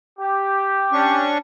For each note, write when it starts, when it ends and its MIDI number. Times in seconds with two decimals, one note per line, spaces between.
0.19 1.31 67
0.93 1.38 61
0.93 1.38 62
0.93 1.38 85